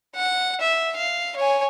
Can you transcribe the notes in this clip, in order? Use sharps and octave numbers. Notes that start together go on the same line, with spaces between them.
F#5
E5
F5
C#5 G#5